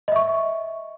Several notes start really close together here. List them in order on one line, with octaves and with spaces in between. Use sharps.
D#5 E5 C#6